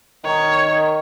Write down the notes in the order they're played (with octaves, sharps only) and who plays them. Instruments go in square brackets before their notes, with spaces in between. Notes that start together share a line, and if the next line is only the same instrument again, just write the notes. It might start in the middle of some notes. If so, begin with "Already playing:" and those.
[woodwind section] D#3 [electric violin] C#5